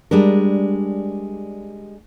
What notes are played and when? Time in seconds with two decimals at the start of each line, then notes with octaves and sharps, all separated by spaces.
0.11 G3 G#3 D4 A#4